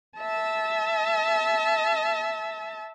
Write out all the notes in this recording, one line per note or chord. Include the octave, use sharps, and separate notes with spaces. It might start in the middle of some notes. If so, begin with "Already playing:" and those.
E5 A5